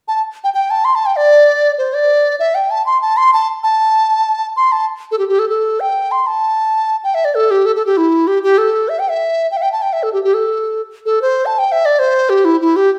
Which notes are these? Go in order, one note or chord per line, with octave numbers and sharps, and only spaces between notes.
A5
G5
G5
A5
C6
A5
G5
D5
C5
D5
E5
G5
A5
C6
A5
C6
A5
A5
C6
A5
A4
G4
G4
A4
A4
G5
C6
A5
G5
E5
D5
A4
G4
A4
A4
G4
E4
G4
G4
A4
E5
G5
E5
G5
E5
G5
A5
G5
E5
A4
G4
G4
A4
A4
C5
A5
G5
E5
D5
C5
G4
E4
E4
G4